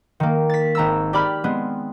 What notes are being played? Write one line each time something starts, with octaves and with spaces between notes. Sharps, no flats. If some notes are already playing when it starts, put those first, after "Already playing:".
D#3 A#3
A6 B6
G#1 A#5 E6
G4 D5 B5 F6
G#3 B3 C4